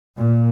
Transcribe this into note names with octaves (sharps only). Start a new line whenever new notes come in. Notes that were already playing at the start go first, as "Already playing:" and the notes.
A#2